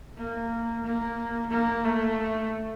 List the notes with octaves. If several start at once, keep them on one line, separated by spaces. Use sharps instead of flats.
A#3
A#3
A#3
A3